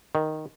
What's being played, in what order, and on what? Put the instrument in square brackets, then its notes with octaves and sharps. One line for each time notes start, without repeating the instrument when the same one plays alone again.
[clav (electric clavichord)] D#3